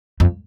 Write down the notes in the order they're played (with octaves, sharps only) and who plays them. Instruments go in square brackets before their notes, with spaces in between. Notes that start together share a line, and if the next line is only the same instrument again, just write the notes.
[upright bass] F2